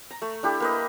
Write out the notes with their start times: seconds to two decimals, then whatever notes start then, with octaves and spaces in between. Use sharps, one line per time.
0.11 A#5
0.22 A3
0.43 D4 E4 G4 A4
0.60 A#3 B4 D#5